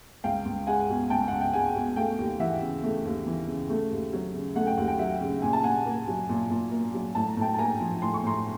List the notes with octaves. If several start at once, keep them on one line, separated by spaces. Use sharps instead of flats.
C#2 F5 G5
C#2
G#3 F#5 G#5
B2
C#2 G5 A5
C#2 F#5
G5
G#3 F#5 G#5
B2
A3 F5 G5
D#2
E3 E5 F#5
C#3
A3
D#2
E3
C#3
A3
D#2
F#3
C#3
A3 F#5
G5
D#2 F#5
G5
F#3 E5 F#5
C#3
A#2 G#5
A5
A#2 F#5 G#5
A#3
F#3
A#2
A#2
A#3
F#3
A2 A5
A#5
A2 G5 A5
A5
A#3 G#5 A#5
F3
A2 C6
C#6
A2 A#5 C6